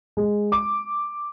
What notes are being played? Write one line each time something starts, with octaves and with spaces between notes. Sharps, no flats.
G#3
D6